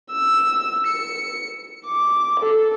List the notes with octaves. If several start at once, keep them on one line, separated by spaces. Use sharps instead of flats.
E6
C#7
D6
A4